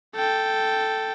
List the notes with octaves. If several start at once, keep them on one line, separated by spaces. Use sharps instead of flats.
A4 G5